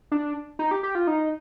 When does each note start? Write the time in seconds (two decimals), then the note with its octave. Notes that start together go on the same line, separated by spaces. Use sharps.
0.12 D4
0.59 D#4
0.71 G4
0.83 G4
0.95 F4
1.07 D#4